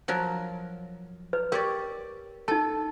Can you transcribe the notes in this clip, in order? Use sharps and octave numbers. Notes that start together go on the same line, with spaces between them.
F3 F#3 A#4
B4
G4 A#4 C#5 D5
D#4 A4 A5